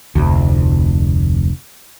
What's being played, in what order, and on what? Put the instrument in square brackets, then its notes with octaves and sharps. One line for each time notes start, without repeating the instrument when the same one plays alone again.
[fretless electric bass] F1 D2